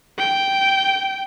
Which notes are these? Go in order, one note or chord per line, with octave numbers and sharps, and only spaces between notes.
G5